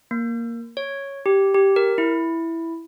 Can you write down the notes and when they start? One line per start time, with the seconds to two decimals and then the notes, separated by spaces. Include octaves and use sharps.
0.11 A#3
0.77 C#5
1.26 G4
1.54 G4
1.76 A#4
1.98 E4